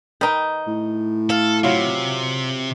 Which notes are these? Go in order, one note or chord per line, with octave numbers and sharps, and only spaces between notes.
D#3 D#4 B4 G5
A2
A4 F5
C3 F#3 E4 F4